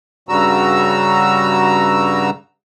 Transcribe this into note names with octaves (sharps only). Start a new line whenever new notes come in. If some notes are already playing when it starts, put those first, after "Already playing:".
G2 C#3 G3 F#4 A#5 E6